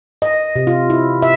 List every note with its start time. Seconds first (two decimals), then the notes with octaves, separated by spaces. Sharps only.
0.22 D#5
0.56 C3
0.67 F4
0.90 E4
1.22 E5